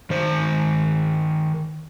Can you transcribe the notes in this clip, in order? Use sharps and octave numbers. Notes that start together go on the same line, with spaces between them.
D#3 C5